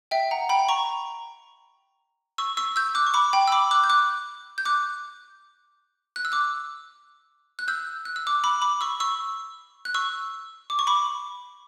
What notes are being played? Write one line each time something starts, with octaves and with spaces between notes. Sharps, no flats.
E5 G5
F#5 A#5
G5 B5
A#5 C#6
C#6 E6
C#6 E6
E6 G6
D6 F#6
C#6
B5 D6
G5 B5
E6
B5 D6
D6 F#6
G6
D6 F#6
G6
D6 F#6
F#6
E6
D6 F#6
F#6
E6 G6
F#6
E6
D6 F#6
B5 D6
B5 D6
C#6 E6
C#6 E6
F#6
C#6 E6
D6
C#6
B5 D6